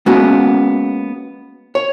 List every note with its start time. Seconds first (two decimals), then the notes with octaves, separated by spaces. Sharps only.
0.06 G#3 A#3 B3 C#4 F#4
1.75 C#5